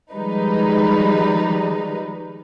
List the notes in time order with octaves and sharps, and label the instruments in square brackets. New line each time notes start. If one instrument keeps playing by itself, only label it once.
[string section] D#3 F3 G3 G#3 D#4 B4